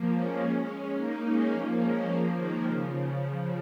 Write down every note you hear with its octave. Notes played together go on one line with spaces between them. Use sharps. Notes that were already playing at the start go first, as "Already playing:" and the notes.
Already playing: F3 A#3
G#3 C#4
A#3 D#4
G#3 C#4
F3 A#3
G#3 C#4
F3 A#3
D#3 G#3
C#3 F3
C#3 F3